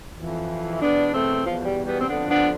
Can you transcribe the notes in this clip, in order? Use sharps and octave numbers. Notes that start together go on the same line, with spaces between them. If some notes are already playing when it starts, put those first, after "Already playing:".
F2 E3
E2 B2 B3 D4
A3 C4
E2 B2 F3
F3
G3
G3 B3
C4
F2 D3 F3 B3 D4
B3 D4